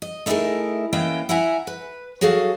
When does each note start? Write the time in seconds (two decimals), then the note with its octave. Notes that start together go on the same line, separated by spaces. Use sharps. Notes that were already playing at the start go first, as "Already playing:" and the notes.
0.02 D#5
0.26 A3 D#4 E4 F#4 G#4 A#4
0.93 E3 A#3 B3 C#4 D#5 G5
1.29 E4 E5 F#5 G#5 A#5
1.67 B4
2.21 F#3 F#4 G#4 A4 F5